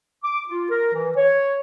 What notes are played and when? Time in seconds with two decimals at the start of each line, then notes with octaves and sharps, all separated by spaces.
0.23 D6
0.48 F4
0.70 A#4
0.94 E3
1.17 C#5